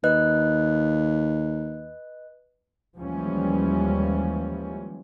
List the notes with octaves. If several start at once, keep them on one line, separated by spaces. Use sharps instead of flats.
D#2 B4 D#5 F#6
D#2 E3 F3 G3 G#3 C#4